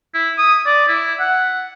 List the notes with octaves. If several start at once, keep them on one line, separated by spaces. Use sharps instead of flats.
E4
D#6
D5
E4
F#5